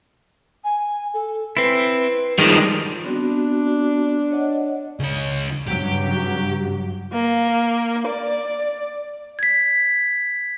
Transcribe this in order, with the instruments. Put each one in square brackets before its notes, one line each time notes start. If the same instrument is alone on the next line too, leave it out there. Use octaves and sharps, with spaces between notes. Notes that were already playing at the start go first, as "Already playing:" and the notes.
[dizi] G#5
A4
[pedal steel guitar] C4 E4 [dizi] B4
[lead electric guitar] D#3 F3 [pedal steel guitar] G3 G#3 G4 [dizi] G#4
[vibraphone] B3 C4 F#4 [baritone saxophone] D4
[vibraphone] C#5 D#5 F#5
[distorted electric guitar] C#2 C#5
[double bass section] G2 C#3 F#3 [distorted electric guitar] G4
[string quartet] A#3
D5
[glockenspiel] G#6 B6